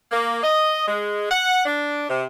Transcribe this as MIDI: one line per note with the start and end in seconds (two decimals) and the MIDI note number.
0.11 0.39 58
0.43 0.85 75
0.87 1.27 56
1.30 1.64 78
1.65 2.03 62
2.09 2.23 48